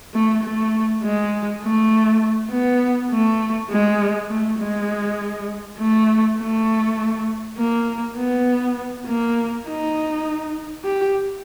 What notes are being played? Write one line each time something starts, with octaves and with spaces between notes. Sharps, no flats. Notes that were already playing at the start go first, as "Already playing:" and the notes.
A3
A3
G#3
A3
B3
A3
G#3
A3
G#3
A3
A3
A#3
B3
A#3
D#4
G4